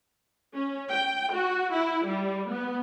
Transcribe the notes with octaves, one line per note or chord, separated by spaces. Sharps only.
C#4
G5
F#4
E4
G3
B3